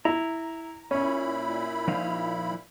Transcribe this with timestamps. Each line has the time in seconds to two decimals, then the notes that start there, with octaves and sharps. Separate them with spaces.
0.05 E4 A#5
0.91 A#2 C#4 E4 B5
1.88 F3 D#4 F5